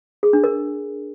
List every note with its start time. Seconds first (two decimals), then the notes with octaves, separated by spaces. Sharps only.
0.23 G#4
0.33 D4
0.44 A#4